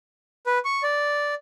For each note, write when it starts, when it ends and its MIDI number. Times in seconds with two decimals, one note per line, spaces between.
0.46 0.59 71
0.65 0.83 85
0.83 1.34 74